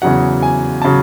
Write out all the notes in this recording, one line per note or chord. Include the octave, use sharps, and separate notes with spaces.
E2 C#3 F#3 F#5
G#5
C#3 F#3 A5